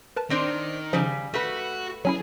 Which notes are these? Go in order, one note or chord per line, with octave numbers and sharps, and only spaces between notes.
A#4 B4 A5
D#3 C4 D4 C5
C#3 F3 G3
A3 F#4 B4
F#3 C#4 E4 G#4